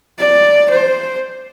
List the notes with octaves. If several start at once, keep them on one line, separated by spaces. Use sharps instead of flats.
D5
C5